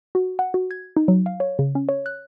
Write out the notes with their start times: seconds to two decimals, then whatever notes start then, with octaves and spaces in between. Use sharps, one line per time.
0.15 F#4
0.39 F#5
0.54 F#4
0.71 G#6
0.97 D#4
1.08 F#3
1.26 F5
1.40 C#5
1.59 C#3
1.75 C#4
1.89 C#5
2.06 F#6